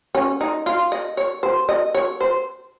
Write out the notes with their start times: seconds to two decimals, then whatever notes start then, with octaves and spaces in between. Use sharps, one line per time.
0.15 C#4
0.41 D#4
0.66 F4
0.92 D#5
1.17 C#5
1.43 C5
1.69 D#5
1.94 C#5
2.20 C5